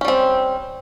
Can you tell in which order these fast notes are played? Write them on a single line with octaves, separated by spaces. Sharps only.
C#4 G3 C4